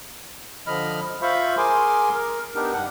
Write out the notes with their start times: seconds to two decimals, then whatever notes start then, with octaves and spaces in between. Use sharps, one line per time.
0.67 D3 F3 D#5 B5 F6
1.22 F4 C5 E5 F5 B5 C#6
1.58 G#4 A#4 G#5 C6 D6
2.14 A#4
2.55 B3 D4 D#4 G4 A#4
2.73 G2 D4 F#5